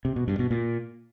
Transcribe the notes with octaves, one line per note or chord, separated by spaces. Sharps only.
C3
B2
G2
B2
A#2